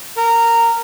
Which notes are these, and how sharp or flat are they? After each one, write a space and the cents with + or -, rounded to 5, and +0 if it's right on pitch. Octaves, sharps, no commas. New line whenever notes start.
A#4 -15